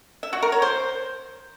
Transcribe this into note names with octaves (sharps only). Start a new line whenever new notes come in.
E5
F#4
A#4
C#5
C5